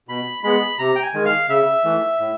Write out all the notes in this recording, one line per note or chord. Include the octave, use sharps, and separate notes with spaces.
B2 B5
G#3 B3 B5
C3 A#5
G5
G#5
D#3 G#3
F5
C#3 E5
E3 A3
A2